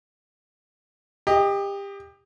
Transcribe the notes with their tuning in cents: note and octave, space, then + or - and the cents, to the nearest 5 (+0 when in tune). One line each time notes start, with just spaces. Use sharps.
G4 +25 D#5 +0